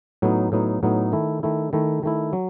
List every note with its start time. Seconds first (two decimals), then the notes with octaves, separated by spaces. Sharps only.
0.22 A2 F#3 B3 D#4
0.52 A2 F#3 B3 D#4
0.83 A2 F#3 B3 D#4
1.12 D#3 A3 E4
1.43 D#3 A3 E4
1.73 D#3 A3 E4
2.03 D#3 A3 E4
2.33 F#3